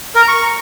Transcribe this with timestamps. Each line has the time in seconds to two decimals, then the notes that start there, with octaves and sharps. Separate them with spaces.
0.15 A#4
0.22 A#5
0.28 C#6